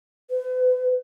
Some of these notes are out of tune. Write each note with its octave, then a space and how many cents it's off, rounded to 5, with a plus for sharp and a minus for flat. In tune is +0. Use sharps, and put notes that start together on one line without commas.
B4 +40